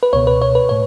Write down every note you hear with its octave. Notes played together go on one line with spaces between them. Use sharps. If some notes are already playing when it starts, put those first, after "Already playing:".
B4
C#2 B2 C#5
B4
C#5
B4
A2 C#5